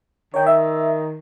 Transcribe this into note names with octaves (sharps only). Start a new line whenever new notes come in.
D#3 C#5 G5
E5